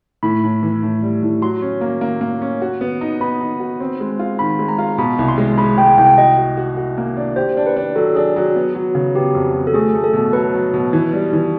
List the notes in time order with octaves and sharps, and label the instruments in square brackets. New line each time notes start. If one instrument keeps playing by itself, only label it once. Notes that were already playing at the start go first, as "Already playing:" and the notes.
[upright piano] A2 [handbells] B5
[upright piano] A2
E3
A2
G3
A2
[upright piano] F#3 [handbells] C6
[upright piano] C#4
A#3
A#3
A#3
C#4
F#4
B3
D#4
[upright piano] B3 [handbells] B5
[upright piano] D#4
F#4
C4
G#3
F4
[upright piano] D#3 [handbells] B5
[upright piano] G#3
[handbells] A#5
[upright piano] F4
[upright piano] B2 [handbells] B5
[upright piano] C2
[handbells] C6
[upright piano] G#3
[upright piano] G#3 [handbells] B5
[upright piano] G#3 [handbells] G5
[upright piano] C2 [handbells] G5
[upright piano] F#4 [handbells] D#5
[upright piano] F#4
F#4
F#4
A#3
D4
[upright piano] G4 [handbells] C5
[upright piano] D4
[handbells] B4
[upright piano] D4
[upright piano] F#3 [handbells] A4
[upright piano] D4 [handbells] G#4
[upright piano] F#3
B3
F#3
C#3
[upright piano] B3 [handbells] G4
[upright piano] F2
F#3
[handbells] A4
[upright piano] A3 [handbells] G#4
[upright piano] A3
[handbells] A4
[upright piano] B2
[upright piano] F#3 [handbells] B4
[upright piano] F#3
B2
E3
G3
E3